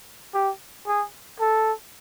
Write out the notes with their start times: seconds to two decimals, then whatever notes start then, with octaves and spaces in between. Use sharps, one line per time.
0.34 G4
0.87 G#4
1.40 A4